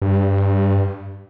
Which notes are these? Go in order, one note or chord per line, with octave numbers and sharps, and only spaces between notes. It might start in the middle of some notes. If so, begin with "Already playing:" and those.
G2